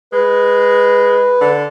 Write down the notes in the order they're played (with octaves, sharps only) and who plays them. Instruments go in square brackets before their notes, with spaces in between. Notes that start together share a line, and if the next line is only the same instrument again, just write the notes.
[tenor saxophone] G#3 [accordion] B4
[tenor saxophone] D3